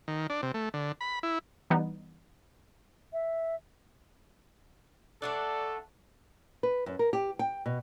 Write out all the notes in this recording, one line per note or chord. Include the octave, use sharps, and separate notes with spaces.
D#3
D4
C3
A3
D3
B5
E4
E3 G3 B3 D#4
E5
A3 D4 A4 D5 F#5
B4
F#2
A#4
G4
G5
B2